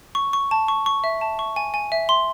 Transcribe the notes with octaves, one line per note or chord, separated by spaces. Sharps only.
C#6
C#6
A5
C#6
C#6
E5
A5
C#6
G#5
G#5
E5
C6